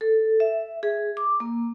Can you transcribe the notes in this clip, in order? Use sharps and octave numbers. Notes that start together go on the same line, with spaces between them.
A4
E5
G#4
D6
A#3